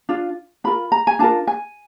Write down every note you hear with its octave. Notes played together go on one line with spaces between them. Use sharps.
D4 F4
D4 F4 A#4 B5
A#5
G#5
D4 F4 A#4 A5
G#5